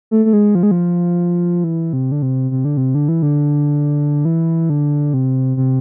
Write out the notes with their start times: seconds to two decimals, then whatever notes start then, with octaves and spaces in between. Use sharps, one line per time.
0.11 A3
0.25 A3
0.33 G#3
0.55 F3
0.63 G#3
0.71 F3
1.64 E3
1.93 C3
2.12 D3
2.22 C3
2.51 C3
2.65 D3
2.77 C3
2.95 D3
3.09 E3
3.23 D3
4.25 E3
4.70 D3
5.14 C3
5.57 C3